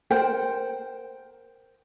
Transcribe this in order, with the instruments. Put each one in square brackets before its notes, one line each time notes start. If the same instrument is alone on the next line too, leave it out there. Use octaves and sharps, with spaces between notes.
[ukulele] A#4 C5 F#5 G5